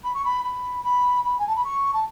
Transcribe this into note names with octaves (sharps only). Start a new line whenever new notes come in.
B5
C#6
B5
B5
B5
B5
G#5
A5
B5
C#6
A5